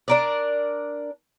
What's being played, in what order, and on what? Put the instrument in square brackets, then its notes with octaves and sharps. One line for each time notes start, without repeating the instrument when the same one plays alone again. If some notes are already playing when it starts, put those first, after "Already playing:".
[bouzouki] D4 A#4 D5